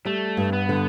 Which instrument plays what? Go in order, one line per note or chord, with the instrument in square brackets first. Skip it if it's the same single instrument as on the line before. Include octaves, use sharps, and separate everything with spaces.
[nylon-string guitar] G3 [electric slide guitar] A3
[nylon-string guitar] G2
[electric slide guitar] B3
[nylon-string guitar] D3